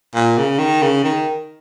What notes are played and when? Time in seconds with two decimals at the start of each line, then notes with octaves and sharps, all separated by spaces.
0.15 A#2
0.38 C#3
0.59 D#3
0.82 C#3
1.04 D#3